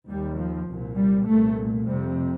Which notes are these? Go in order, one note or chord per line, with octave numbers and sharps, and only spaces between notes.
D#2 G3
F3
C2 A#2
G3
C2 A#2 A3
F2 C3 G3